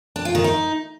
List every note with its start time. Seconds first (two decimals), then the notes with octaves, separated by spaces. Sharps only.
0.16 D4
0.25 F4
0.35 D#3
0.44 D#4